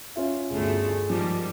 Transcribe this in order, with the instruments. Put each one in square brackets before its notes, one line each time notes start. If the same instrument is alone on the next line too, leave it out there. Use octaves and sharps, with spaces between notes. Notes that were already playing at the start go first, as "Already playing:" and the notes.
[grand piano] C#4 F4 E5
[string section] G1 D2 A3 [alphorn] G#4
[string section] G#2 D#3 G3 [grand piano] F3